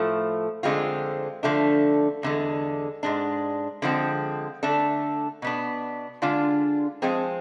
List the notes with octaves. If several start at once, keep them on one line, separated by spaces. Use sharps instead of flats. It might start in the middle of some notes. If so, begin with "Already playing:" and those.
Already playing: A2 F3 A3
F2 D3 G#3 C4 F4
D3 F3 A3 D4
E2 D3 G#3
G#2 G#3 D4
D3 F3 G#3 C4
D3 A3 D4 A4
B2 B3 D4
D3 G#3 D4 F4
F3 G#3 C4 G#4